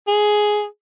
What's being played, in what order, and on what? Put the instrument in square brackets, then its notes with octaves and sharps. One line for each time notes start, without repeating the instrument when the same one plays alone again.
[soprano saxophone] G#4